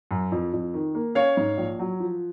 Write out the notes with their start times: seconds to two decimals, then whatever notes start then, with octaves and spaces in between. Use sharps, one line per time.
0.11 F#2
0.32 F2
0.53 F2
0.74 D#3
0.95 A#3
1.15 C#4 C#5 F5
1.37 G#2
1.58 A#1
1.79 F#3
2.00 F3